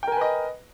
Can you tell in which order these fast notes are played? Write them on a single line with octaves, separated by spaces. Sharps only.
G5 A#4 G#5 B4 D#5